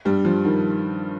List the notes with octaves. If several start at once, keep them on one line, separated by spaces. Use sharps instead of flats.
G2 G3
F3
D#3